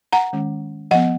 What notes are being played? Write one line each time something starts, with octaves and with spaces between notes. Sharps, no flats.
F#5 A#5
D#3 G#3 C#4
F3 B3 D#5 F#5